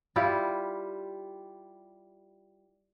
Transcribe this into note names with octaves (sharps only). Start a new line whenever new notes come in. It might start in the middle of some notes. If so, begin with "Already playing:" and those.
G3 E4 F4 G4